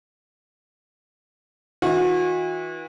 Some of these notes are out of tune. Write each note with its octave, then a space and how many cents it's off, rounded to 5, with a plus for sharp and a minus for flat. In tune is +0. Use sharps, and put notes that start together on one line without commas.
E3 -35 F#4 -35